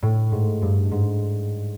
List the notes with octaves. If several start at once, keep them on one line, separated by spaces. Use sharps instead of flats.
A2
G#2
G2
G#2